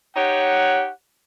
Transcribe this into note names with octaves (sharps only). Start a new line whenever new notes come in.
D#4 G4 C#5 F#5